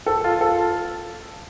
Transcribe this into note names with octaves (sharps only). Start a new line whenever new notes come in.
A4
F4
A4